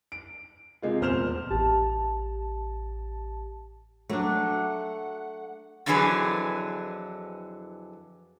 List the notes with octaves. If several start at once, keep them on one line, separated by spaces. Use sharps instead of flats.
D7
C3 G#3 F4
D#1 E2 C5 F6 E7 F7
A1 G4 A5
F#3 A3 D4 F#5
F2 D3 E3 F#3 G#4 B4